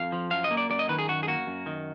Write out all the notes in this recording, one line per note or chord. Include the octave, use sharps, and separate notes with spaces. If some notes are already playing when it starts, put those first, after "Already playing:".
Already playing: F2 F5
F3
F#2 F5
D#5
A#3
D5
F#2 D5
D#5
D#3 B4
G#4
F#2 F#4
G#4
A#3 F#4
F#2
D#3